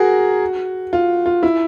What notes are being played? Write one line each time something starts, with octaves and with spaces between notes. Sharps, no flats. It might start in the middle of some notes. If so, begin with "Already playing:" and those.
Already playing: F#4 G#4 A#4
F4
F4
E4